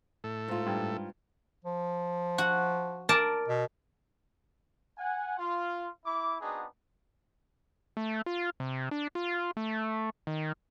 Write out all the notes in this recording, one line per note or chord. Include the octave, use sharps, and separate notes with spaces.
A2 A4
G#2 F4
G2
F3
F#4
A#4 D5 A5
B2
F#5 G#5
F4
E4 D6
B3 C4 D4 D#4 F#4 G#4
A3
F4
C3
D4
F4
A3
D#3